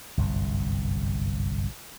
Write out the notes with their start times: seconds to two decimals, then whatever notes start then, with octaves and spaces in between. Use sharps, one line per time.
0.17 G1 C2 F#2